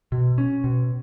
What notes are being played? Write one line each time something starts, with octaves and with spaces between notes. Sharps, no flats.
B2
C#4
B2